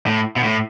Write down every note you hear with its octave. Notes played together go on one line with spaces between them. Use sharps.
A2
B2
A2